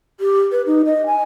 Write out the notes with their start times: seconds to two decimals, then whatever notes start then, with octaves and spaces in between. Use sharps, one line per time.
0.20 G4
0.52 B4
0.66 D#4
0.85 D#5
1.06 G#5